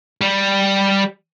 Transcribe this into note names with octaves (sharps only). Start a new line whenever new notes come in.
G3